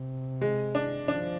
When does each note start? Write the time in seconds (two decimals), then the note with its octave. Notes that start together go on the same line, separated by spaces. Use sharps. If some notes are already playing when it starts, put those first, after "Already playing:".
Already playing: C3
0.41 G#3
0.75 D4
1.08 F3 D4